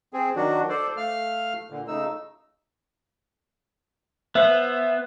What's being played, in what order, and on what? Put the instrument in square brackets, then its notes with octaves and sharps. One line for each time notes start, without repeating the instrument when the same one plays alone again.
[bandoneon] C4 G#4
D#3 F#3 D4 F#4
A4 C5 D5
A3 F5 F6
A#2 D3
C#3 A3 D#4 E6
[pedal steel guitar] B3 [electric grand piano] C5 E5